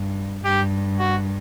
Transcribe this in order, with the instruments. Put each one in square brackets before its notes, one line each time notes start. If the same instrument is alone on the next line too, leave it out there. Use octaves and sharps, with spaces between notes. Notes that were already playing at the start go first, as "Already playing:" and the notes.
Already playing: [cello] G2
[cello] G2 [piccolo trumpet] G4
[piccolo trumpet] F#4